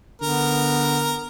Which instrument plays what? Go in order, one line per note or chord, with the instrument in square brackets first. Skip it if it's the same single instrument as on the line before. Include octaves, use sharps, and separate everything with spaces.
[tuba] D3 [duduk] B3 [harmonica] A#4